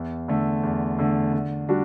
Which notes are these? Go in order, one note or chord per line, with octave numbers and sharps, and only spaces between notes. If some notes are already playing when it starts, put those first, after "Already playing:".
Already playing: E2
D3 A3
E2
D3 A3
D3
G3 D4 F#4